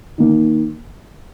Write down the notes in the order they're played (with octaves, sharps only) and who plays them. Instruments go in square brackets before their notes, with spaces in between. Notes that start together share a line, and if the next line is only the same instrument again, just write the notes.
[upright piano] D#3 A#3